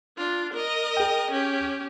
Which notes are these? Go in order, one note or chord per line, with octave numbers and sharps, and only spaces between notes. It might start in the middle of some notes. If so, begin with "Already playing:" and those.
D4 F4
A#4 D#5
G#4 G5
C#4 G4